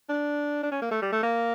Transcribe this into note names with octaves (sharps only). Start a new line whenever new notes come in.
D4
D4
C#4
A#3
A3
G3
A3
A#3